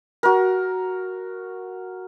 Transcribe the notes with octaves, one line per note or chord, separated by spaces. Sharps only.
F#4 A#4